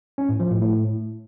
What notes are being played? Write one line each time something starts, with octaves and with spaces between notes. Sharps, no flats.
C#4
A2
F3
A2
A2